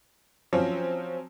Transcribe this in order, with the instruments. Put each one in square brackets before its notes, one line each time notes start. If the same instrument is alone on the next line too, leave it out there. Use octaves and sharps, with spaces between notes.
[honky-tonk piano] F3 F#3 C4 C#4